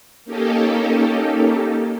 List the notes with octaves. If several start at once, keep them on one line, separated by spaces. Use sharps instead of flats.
A#3 C#4 D#4 G4 A4